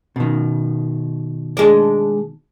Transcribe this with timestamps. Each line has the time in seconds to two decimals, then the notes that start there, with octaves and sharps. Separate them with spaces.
0.16 B2 D#3
1.57 G#3 D4